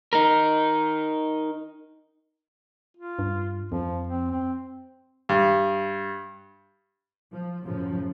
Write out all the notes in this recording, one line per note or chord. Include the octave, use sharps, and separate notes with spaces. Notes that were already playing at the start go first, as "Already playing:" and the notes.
D#4 A#4
F4
G2
F2 F3
C4
C4
G2
F3
F#2 A2 C#3 F3